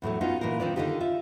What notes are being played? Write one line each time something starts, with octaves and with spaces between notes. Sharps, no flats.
E2 A2 F#3 A3
B3 C#4 D#4 F4 F#4
A#2 E3 D#4 A#4
D#3 C4 D#4 F4 B4 D5
D3 D#3 D4 D#4 F4 G4
F4 E5